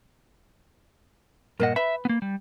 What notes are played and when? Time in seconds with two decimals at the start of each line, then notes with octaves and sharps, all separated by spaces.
1.60 G2 A#2 A#4 C#5 D#5 F#5
1.76 B4 E5 B5
2.05 A#3 B3
2.22 G3